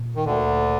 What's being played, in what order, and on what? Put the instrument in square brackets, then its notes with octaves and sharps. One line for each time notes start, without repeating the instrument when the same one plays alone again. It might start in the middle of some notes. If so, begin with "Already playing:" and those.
Already playing: [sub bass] A#2
[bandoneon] D#3
D2 D3